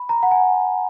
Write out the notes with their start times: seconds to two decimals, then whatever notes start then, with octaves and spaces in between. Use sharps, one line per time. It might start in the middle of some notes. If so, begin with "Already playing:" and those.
Already playing: B5
0.09 A#5
0.23 F#5
0.31 G#5